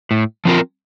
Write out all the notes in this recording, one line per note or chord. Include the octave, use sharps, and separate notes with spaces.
A2
F3 C4 F4 A#4